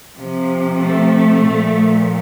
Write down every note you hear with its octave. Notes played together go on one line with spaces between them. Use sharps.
C3 F3
A3
A#2 F3